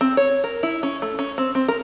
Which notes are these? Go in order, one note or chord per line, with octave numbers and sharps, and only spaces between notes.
C4
C#5
A#4
E4
C#4
A3
C#4
C4
C4
A#4